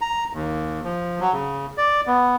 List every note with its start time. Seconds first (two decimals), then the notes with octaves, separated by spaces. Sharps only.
0.01 A#5
0.33 D#2
0.84 F3
1.20 F#3
1.33 C#3
1.78 D5
2.07 B3